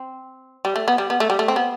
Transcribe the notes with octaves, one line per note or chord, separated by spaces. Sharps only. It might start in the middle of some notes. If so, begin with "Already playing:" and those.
Already playing: C4
G3
A3
B3
G3
B3
A3
G3
A3
C4
B3